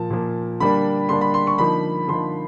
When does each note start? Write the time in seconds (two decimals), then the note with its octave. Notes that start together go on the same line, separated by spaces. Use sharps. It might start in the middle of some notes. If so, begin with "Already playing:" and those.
Already playing: A#2 F3 A#3 A5
0.10 A#2 F3 A#3
0.60 D3 G3 A#3 D4 B5
1.09 D3 G3 A#3 D4 C6
1.21 B5
1.34 C6
1.47 C#6
1.58 D3 F3 A#3 D#4 B5
2.08 D3 F3 A#3 D#4 C6